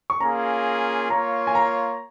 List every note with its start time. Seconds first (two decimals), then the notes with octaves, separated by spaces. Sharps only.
0.10 C#6
0.20 A#3 C#4 F4 G#4 A#5
1.10 A#3 F4 C#5 A#5
1.47 G#5
1.55 A#5